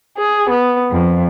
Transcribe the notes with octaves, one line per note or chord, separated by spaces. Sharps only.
G#4
B3
F2